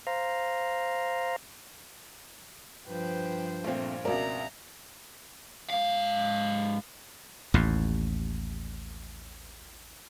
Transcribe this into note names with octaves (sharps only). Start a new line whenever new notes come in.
C5 F5 A#5
G2 F3 B4 C5 G5
A#1 A#2 A3 C4
C#2 B2 C4 A#4 D5 E5 A#5
G#2 F5
A1 D#2 A2